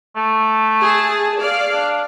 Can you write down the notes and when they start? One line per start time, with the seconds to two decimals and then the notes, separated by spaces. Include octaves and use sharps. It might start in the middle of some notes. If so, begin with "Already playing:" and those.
0.16 A3
0.81 G#4 A5
1.38 D5 F5
1.71 D4